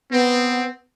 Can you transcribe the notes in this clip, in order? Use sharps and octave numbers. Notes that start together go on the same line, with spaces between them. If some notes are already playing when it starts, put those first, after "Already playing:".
B3 C4